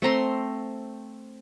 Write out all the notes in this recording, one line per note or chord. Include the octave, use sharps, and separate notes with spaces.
A3 C4 A#5 C6